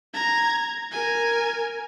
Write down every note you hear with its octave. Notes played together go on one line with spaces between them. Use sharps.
A#5 G#6
A#4 G#5